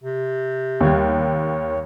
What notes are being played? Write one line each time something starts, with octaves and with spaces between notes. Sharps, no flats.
C3
D#2 G3 C#5